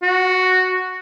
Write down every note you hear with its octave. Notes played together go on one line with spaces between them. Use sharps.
F#4